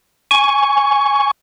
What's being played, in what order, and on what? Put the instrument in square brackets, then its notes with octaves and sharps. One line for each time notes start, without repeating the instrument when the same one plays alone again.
[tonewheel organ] G#5 C#6